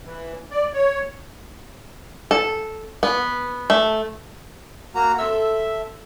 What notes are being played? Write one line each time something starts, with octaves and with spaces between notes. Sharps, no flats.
E3
D5
C#5
A4
B3
A3
A#3 F#4 A#5
C4 A4 E5 E6